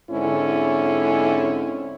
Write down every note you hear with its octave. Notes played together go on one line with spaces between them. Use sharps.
G#2 D3 C4 C#4 E4